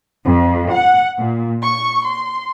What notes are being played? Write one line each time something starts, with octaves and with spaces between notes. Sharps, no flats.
F2
F#5
A#2
C#6
C6